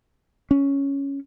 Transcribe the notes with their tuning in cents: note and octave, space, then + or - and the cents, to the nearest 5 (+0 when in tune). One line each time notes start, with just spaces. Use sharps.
C#4 +0